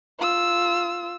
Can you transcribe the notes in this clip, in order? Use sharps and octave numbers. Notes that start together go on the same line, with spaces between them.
F4 E6